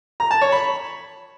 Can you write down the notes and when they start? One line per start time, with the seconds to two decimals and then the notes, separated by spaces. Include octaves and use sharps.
0.20 A#5
0.31 A5
0.41 C#5
0.52 B5